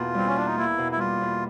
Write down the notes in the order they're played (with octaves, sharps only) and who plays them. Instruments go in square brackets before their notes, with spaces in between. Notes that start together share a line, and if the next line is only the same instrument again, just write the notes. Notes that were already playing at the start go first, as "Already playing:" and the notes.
Already playing: [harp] E2 B2 A#3 [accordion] F4
[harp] G3 [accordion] C4
[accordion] C#4
[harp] E2 [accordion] D4
[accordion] D#4
[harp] A#3 [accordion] E4
[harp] B2
[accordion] E4
[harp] G3 [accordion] F4
[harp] E2